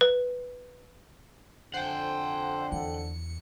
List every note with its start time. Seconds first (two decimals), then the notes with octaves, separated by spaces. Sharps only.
0.01 B4
1.74 F2 D3 C5 F#5 G5
2.72 E2 C#7